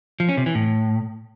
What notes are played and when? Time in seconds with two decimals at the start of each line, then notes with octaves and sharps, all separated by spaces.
0.20 F3
0.29 C#4
0.37 C3
0.46 E3
0.55 A2